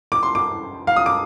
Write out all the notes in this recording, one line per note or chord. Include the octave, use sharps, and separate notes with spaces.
D6
C6
D6
F5
D#6
D6